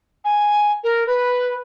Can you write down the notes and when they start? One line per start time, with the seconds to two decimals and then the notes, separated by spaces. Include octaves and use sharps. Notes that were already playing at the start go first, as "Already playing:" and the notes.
0.25 G#5
0.84 A#4
1.07 B4